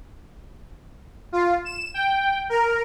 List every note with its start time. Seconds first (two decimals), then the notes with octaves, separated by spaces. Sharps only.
1.32 F4
1.65 E7
1.94 G5
2.50 A#4